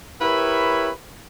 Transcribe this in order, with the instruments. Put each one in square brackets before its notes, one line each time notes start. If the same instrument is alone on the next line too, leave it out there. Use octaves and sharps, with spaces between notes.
[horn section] E4 G4 A#4 B4 C#5 E5